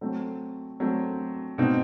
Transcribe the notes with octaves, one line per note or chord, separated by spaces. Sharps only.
F#3 A3 C4
F#3 A3 C4
B2 A3 C4 D#4